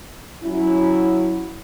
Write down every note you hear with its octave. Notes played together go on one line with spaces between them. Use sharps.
F#3 C#4 E4